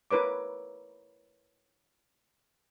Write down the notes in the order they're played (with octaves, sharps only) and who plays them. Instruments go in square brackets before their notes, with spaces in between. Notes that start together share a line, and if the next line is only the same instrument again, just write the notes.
[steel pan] E4 A#4 B4 C#5 D6